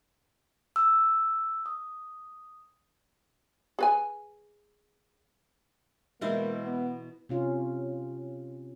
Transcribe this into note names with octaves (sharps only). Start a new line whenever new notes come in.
E6
D#6
G#4 B4 G#5
B2 E3 G#3 A#3 E4 C5
B3
C3 C#4 F4